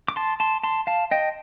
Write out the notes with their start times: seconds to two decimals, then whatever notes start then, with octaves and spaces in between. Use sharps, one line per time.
0.08 D6
0.16 A5 C6
0.40 A5 C6
0.63 A5 C6
0.87 F5 A5
1.11 D#5 G5